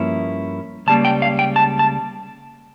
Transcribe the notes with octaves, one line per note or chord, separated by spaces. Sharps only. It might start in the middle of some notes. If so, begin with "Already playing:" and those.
Already playing: G2 F3 A#3 C#4 E4
C#2 C#3 G3 A#3 A5
G5
F5
G5
A5
A5